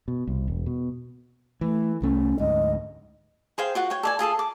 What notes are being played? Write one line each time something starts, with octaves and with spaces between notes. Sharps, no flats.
B2
C2
E1
B2
E3 A3
C2 A3 C#4
D2 G#2 D#5
G#4 C5 F5 G5
F4 F#4 F#5
C#5 G5
A4 D5 G#5
F4 G#4 A4 A5
D6